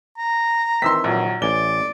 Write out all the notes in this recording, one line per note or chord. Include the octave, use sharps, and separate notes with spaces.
A#5
D#3 E3 C4 C6 E6 B6
A#1 F#3
A1 D5 G#5 G7